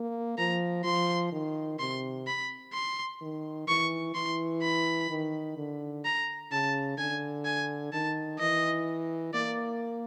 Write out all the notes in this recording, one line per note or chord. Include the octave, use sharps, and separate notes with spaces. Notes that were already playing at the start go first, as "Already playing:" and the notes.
Already playing: A#3
F3 A#5
F3 C6
D#3
C3 C6
B5
C6
D#3
E3 C#6
E3 C6
B5
D#3
D3
A#5
C#3 A5
D3 G#5
G#5
D#3 A5
E3 D#5
A#3 D5